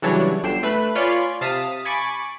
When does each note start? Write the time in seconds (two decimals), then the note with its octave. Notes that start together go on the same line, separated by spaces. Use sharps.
0.02 C#3 E3 F#3 G3 D4 C#5
0.43 G1 D3 G5 C7 E7
0.63 A3 B4 B5 F#6
0.95 F4 C#5 D5 G#5 B5 C6
1.41 C3 F5 A5 D#6 B6
1.85 G#5 B5 C#6 D6 A6